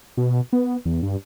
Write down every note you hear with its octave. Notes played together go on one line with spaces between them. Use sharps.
B2
B3
E2
G2